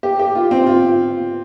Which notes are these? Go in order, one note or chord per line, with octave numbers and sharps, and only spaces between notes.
G4
G4
F4
C4
F4